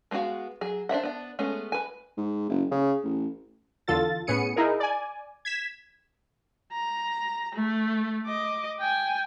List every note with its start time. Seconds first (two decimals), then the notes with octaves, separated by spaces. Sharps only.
0.11 G#3 B3 F4 F#4 F5
0.61 F#3 G#4
0.89 D4 C5 E5 F#5
1.04 B3 D4
1.39 G#3 A3 B3 C#4
1.72 B4 G#5
2.18 G#2
2.50 F#1
2.71 C#3
3.04 A1
3.88 E2 D3 F4 A4 A6
4.27 A2 B3 C#4 G#4 C#7 D#7
4.56 D#4 E4 G#4 A#4
4.80 D5 G#5
5.45 G#6 B6 E7
6.72 A#5
7.54 A3
8.26 D#5 D6
8.80 G5 G#5